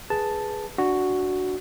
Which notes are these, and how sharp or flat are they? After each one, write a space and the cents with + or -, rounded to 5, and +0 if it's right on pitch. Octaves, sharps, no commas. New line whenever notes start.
G#4 +0 B4 -5 A5 +0
D4 +0 F#4 +0